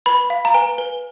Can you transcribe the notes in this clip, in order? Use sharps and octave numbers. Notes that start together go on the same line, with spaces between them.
B4 B5
F5
A#5
B4 G#5
B4